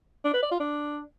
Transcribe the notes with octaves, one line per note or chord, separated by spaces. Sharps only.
D4
B4
D5
F4
D4